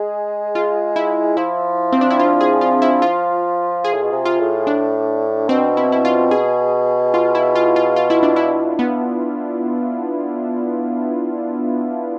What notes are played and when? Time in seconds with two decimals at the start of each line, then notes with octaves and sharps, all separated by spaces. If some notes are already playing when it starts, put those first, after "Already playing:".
Already playing: G#3 G#4
0.55 F4
0.96 E4
1.37 F3 E4
1.92 C4
2.01 D4
2.10 E4
2.19 F4
2.41 G#4
2.61 F4
2.82 E4
3.02 F4
3.84 G#4
3.94 A2
4.03 B2
4.12 C3
4.25 F4
4.39 A2
4.67 D4
5.49 B2 C4
5.77 E4
5.92 E4
6.05 F4
6.31 G#4
7.14 F4
7.35 E4
7.55 F4
7.76 F4
7.96 F4
8.10 E4
8.23 D4
8.36 E4
8.79 B3